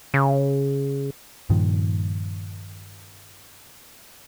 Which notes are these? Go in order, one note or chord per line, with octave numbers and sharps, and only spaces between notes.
C#3
G2 A#2 D#3 F3